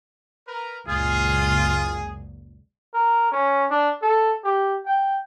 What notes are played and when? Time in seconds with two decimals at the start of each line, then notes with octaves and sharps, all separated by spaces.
0.47 A#4 B4
0.88 F#1 C#2 A#2 F4 G#4
2.94 A#4
3.32 C#4
3.70 D4
4.02 A4
4.44 G4
4.86 G5